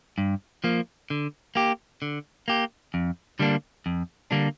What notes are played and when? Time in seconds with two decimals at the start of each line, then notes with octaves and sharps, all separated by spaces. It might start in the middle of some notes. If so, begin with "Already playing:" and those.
0.18 G2
0.64 F3 A#3
1.10 D3
1.56 A#3 G4
2.02 D3
2.48 A#3 G4
2.94 F2
3.39 D3 G3 A#3 D4
3.86 F2
4.31 D3 G3 A#3 D4